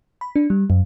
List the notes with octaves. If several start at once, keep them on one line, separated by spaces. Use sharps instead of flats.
B5
D4
G3
F#2